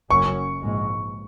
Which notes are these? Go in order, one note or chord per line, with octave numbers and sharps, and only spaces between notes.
F#1 F#2 F#3 C#4 C#6
A#1 G#2 G#3